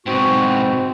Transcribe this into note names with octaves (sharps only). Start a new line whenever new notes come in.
G#2 B2 C4 F#4